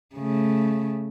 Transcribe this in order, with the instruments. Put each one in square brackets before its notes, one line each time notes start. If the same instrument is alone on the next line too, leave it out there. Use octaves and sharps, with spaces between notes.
[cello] C#3 A3